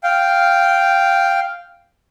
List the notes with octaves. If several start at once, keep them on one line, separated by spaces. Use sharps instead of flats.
F5 G5